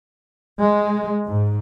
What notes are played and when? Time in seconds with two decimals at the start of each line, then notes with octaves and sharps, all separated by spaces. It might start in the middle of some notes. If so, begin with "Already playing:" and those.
0.59 G#3
1.26 G#2